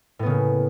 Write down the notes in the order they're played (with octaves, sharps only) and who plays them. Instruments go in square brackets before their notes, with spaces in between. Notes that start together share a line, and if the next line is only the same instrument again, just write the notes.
[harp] A2
B3
C#3
A#3